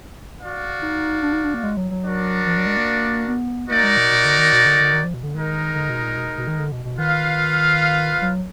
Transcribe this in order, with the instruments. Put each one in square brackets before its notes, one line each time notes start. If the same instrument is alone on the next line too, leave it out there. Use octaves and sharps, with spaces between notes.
[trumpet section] F#4 D5 F5
[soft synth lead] D#4
D4
D#4
D4
A#3
G#3
F#3
F#3
[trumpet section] D4 F#4 A#4 D5
[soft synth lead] F3
F#3
G#3
A#3
B3
[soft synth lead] A#3 [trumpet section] D#4 F#4 A#4 D5
[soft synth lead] G#3
B2
B2
D3
D#3
B2
D3
D3
D#3
F3
B2
D3
[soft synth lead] D#3 [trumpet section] G#3 D#4 A#4
[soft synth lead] D3
B2
A#2
B2
B2
D#3
D3
B2
B2
[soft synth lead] D#3 [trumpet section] F4 B4 F5
[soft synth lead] F#3